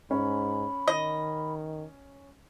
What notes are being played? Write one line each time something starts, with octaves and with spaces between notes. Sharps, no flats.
G#2 C#4 B5
D#3 D#5